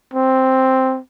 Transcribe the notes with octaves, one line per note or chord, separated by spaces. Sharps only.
C4